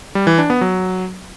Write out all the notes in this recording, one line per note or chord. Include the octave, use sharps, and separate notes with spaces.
G3
E3
D4
B3
F#3